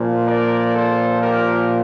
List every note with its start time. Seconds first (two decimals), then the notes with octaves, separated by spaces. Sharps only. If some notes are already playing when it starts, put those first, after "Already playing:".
Already playing: A#2 F3
0.27 A#4 D5
0.74 A4 C5
1.21 G4 A#4